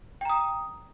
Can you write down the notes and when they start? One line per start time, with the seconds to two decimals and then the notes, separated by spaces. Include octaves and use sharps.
0.21 G5
0.25 A#5
0.30 D#6